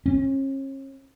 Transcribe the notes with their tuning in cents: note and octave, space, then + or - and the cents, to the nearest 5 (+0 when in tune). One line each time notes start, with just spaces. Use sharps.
C#4 -40